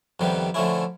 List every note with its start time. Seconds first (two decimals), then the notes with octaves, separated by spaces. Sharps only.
0.20 F2 C3 D#3 G3 B3
0.54 D3 F3 A3 C#4 E4